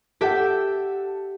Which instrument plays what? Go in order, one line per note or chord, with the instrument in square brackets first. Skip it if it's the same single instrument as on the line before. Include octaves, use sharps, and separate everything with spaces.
[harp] G4 E5 G6 [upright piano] A4 F#5